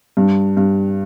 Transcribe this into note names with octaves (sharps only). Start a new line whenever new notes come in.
G2
G2